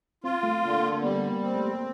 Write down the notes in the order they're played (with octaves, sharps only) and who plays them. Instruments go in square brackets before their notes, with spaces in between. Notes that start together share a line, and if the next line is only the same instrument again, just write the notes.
[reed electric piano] C4 [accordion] F4
[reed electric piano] A3
[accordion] D3 [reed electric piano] A#3
[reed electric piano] A#3
[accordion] G3 [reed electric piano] B3
[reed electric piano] A#3
[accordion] C4
[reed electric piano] A3